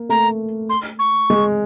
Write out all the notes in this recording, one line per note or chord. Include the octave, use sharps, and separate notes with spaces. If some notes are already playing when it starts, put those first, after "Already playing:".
Already playing: A#3
A3 A#5
C6
C#6
G#3